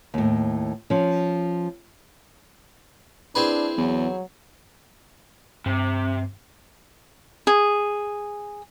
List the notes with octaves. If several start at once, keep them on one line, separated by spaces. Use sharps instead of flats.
D#2 A2
F3 C#4
C4 D4 E4 G#4 B4
E2 F#3
G2 C3
G#4